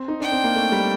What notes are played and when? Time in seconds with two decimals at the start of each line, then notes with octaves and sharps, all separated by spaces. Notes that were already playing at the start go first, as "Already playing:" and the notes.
Already playing: C4
0.08 D#4
0.20 D4 G5
0.32 C4
0.44 A#3
0.56 A3
0.72 G3